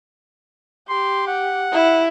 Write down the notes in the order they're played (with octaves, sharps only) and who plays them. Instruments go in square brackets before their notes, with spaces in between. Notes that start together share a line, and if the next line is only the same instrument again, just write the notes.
[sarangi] G4 [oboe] C6
[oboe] F#5
[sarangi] E4